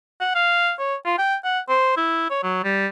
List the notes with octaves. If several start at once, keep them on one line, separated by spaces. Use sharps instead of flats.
F#5
F5
C#5
F4
G5
F#5
C5
E4
C#5
F#3
G3